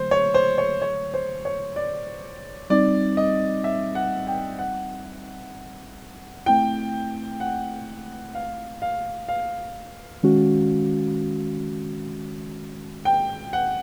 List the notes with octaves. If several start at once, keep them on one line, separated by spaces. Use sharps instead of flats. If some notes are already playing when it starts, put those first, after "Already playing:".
Already playing: D3 F#3 A3 C5
C#5
C5
C#5
C#5
C5
C#5
D5
G3 C4 D#4 D5
D#5
E5
F#5
G5
F#5
A3 C4 E4 G5
F#5
F5
F5
F5
D#3 G#3 C#4 F#4
G5
F#5